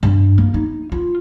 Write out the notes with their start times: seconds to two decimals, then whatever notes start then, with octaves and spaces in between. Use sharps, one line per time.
0.03 G2
0.38 A#3
0.54 D#4
0.92 F4